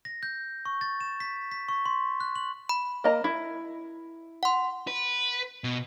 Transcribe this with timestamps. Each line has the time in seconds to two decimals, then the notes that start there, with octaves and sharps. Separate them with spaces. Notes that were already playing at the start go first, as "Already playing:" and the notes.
0.05 A#6
0.23 G6
0.65 C#6
0.81 A6
1.01 E7
1.20 B6
1.51 B6
1.68 C#6
1.86 C6
2.20 F#6
2.36 F#7
2.69 B5
3.04 A#3 D#5 A#5
3.24 E4
4.43 F#5 C6
4.87 B4
5.64 B2